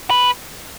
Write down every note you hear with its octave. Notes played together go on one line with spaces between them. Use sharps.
B4